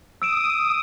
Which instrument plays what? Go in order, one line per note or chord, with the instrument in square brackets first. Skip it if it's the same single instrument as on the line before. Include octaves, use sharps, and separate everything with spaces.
[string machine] D#6 [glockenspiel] E6 D7 E7